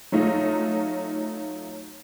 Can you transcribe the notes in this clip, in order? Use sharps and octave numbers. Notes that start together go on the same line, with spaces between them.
F#3 A3 D#4 F4